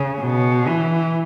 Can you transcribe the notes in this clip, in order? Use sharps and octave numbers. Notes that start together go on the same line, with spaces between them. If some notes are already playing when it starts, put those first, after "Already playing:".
Already playing: C#3
B2
E3